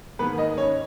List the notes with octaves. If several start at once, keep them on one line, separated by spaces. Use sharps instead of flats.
G#2 D#3 A#3 B3 B4
D#4 D#5
C#4 C#5